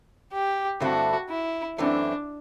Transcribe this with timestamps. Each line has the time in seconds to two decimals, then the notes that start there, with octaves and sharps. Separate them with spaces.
0.33 G4
0.80 G2 D3 A3 C4 E4 F#4
1.30 E4
1.78 F#2 E3 A3 C4 D4